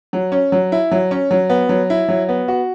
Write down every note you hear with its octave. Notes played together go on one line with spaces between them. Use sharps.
F#3
C#4
F#3
E4
F#3
C#4
F#3
B3
F#3
E4
F#3
B3
F#4